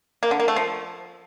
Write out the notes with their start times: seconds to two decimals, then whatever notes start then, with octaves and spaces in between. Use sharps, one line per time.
0.23 A#3
0.31 D3
0.39 A#3
0.48 A3
0.56 F3